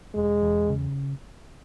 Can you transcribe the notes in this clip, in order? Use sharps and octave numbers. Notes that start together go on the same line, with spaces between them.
E1 G#3
E2
C#3